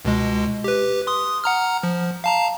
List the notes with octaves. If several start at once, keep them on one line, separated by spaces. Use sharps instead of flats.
C#2 B2 G#3
G4 B4
C6 D#6
F#5 A#5 F6
F3
F5 A5 A#5